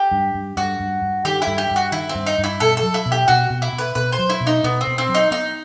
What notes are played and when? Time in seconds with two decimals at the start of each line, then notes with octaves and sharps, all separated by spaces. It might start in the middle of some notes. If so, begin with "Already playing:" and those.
Already playing: G4
0.11 G2
0.34 G2
0.57 G2 F#4
0.80 G2
1.02 G2
1.24 D#3 G4
1.42 E4
1.47 G2
1.58 G4
1.70 G2
1.76 F#4
1.92 D#3 E4
2.09 C4
2.15 G2
2.26 D#4
2.38 G2
2.44 E4
2.60 B2 A4
2.77 A4
2.83 F#3
2.94 E4
3.06 B2
3.12 G4
3.28 B2 F#4
3.50 B2
3.62 E4
3.73 B2
3.78 B4
3.95 B2 B4
4.12 C5
4.19 F#3
4.30 E4
4.41 B2
4.47 D#4
4.64 B2 B3
4.81 C4
4.87 B2
4.98 C4
5.09 F#3
5.15 D#4
5.31 B3 D#4